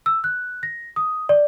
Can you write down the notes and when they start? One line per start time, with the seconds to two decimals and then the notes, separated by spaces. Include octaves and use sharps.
0.06 E6
0.24 F#6
0.63 A#6
0.96 D#6
1.29 D5